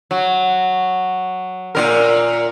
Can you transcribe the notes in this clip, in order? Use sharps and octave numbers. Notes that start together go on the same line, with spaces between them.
F#3
A#2 D3 A#4